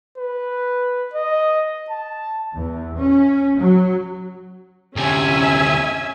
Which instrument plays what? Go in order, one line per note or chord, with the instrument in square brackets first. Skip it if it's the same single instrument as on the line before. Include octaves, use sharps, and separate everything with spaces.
[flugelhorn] B4
D#5
A5
[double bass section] E2
C#4
F#3
[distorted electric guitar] D2 C3 [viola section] C#4 E5 G#5